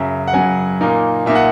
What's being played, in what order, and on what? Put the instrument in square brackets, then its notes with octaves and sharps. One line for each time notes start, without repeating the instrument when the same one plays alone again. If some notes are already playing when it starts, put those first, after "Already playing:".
Already playing: [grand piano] F#2 C#3 F#3 E5
F#5
F#2 C#3 F#3 G#5
A#2 A#3 D#4
A#2 A#3 D#4 E5
F#5